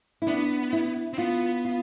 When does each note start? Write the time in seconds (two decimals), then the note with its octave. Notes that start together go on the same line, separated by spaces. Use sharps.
0.22 E4
0.27 B3 D4
0.73 E4
1.13 C4
1.18 B3 F4
1.65 F4